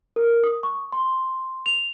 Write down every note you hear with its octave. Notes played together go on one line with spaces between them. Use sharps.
A#4
D#6
C#6
C6
F7